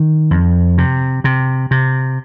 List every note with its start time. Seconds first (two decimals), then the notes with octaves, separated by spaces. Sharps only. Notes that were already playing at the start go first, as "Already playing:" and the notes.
Already playing: D#3
0.31 F2
0.78 C3
1.24 C3
1.71 C3